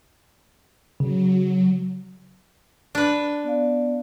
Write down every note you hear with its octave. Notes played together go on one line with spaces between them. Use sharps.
C#3 F#3
D4 B4
B3 D5 F5